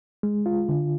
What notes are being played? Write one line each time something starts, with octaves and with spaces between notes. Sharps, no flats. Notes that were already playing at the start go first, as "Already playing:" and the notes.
G#3
F4
D3